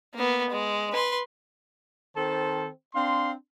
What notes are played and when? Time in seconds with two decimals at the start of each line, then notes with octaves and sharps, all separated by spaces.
0.14 A#3 B3
0.50 G#3
0.92 B4 C6
2.17 D#3 C4 A4 C5 A5
2.95 C4 D4 F5 C6